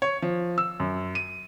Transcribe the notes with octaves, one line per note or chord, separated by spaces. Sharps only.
C#5
F3
E6
F#2
D#7